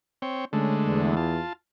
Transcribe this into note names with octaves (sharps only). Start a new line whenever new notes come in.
C4 C#5 G5
D3 G#3 A3 C#4
E2
F4 A5